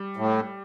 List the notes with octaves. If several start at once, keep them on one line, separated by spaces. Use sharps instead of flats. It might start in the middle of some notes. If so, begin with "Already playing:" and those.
Already playing: G3
A2